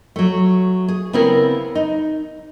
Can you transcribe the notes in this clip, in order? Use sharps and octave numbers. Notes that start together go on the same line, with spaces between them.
F#3 A3
G#4
C#3 B3 C4 E4 A#4
D#4